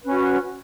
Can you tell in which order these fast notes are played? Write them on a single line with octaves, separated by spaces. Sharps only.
B4 C#4 F#4